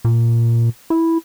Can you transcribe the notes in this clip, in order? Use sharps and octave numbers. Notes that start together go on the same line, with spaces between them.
A#2
E4